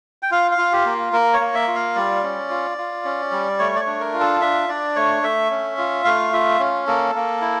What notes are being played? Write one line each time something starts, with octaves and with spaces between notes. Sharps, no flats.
G5
F4 F5
F5
F4
G4
A#3
A#3 A#4
C#5
A#3
E5
F4
F5
G3 D5
C#4
F4
F4
C#4
G3
A3 C#5
D5
C#5
D4
A#4
F4
A4
D4 E5
D4 D5
A3 C#5
A3 E5
C#4
F4
A3 F5
F4 E5
C#4
A#3 A4
A#3
E4